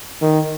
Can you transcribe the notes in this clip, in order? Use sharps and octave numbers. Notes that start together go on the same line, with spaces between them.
D#3